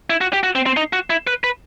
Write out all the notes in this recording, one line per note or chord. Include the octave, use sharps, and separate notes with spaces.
E4
F#4
G4
F#4
C4
C4
D#4
F#4
E4
B4
B4